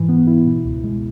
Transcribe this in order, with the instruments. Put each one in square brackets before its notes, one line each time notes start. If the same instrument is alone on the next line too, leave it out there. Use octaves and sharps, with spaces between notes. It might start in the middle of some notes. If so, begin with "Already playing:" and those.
Already playing: [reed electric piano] G#2 E3
B3
E4
B2
C#2
G#3